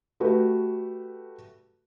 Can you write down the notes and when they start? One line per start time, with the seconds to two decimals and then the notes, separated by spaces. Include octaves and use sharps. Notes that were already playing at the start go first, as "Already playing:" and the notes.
0.20 A3 F#4 G4 B4